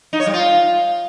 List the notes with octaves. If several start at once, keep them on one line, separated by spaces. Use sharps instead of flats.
D#4
C#5
G3
F4